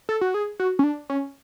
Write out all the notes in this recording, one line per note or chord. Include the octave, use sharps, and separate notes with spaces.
A4
F#4
G#4
F#4
C#4
D4
C#4